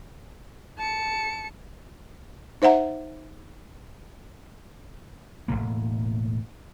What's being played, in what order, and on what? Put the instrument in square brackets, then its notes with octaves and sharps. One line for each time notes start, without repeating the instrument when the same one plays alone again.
[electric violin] A5 C#7
[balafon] D#4 C5 E5 F#5 A#5
[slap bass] E1 D#2 A2 A#3